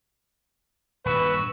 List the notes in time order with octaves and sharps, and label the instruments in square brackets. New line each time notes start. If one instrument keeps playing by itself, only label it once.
[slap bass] D#1 G2 [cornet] B4 [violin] C#6 E6